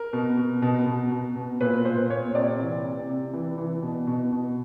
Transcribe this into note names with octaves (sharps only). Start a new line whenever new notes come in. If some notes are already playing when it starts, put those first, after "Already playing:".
Already playing: A#4
B2
B2
B2
B2
B2
B2
A#2 B4
A#2 C5
A#2 C#5
C3 D5
E3
C3
C3
E3
E3
B2
B2
B2